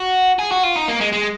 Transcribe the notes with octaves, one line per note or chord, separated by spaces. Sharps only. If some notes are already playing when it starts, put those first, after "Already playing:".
Already playing: F#4
G#4
F#4
F4
D#4
A#3
G#3
G#3